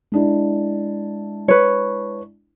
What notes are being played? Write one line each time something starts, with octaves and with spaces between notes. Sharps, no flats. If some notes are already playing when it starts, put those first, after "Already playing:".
G#3 D4 E4
B4 C#5